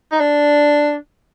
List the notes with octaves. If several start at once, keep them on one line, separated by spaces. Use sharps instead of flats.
D#4
D4